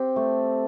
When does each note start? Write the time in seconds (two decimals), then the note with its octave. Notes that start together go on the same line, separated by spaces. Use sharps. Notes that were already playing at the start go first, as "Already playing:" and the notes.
Already playing: C4 G4
0.16 A3